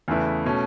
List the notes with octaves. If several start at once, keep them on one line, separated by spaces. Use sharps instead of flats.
E2 C#3 A3 E4 B4
B2 A3 C#4